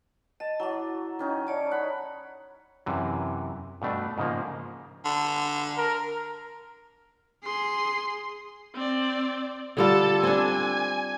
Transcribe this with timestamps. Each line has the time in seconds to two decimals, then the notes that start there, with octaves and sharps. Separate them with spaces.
0.40 D#5 A5
0.60 F#3 E4 F#5 D6
1.19 D#3 C#4 D#4
1.47 C#5 D5 A5
1.71 F#5 B5
2.86 F#2 C3 E3
3.82 G2 B2 A3 D4
4.18 G#2 C#3 F3 A#3
5.05 D3
5.78 A#4
7.44 G#4 C6
8.74 C4 D5
9.77 D3 G3 F4 A4 A5
10.23 C4 D4 G#5